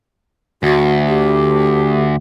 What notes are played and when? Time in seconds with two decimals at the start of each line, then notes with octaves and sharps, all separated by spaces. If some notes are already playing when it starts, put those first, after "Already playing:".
0.63 D2 F#4
1.08 G4